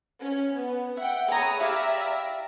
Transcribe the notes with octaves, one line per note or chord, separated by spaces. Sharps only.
C#4
B3
E5 F#5 G5
G#4 B4 C#5 A#5 D#6
E4 G4 D5 E5 F5 A#5